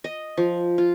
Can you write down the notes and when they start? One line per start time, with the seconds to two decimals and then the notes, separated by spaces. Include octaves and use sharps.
0.04 D#5
0.37 F3
0.78 F4